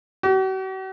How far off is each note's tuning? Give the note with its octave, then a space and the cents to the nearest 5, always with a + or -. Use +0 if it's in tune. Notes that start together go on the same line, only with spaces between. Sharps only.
F#4 +45